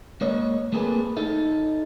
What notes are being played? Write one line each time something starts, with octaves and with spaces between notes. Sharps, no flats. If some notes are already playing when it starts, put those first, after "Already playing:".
G#3 A#3 C#5 D#5
A3 A#3 C4 G#4 A4 B4
D#4 A4 E5